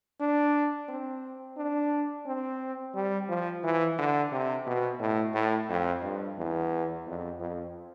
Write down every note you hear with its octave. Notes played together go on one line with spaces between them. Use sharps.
D4
C4
D4
C4
G3
F3
E3
D3
C3
B2
A2
A2
F2
G2
E2
F2
F2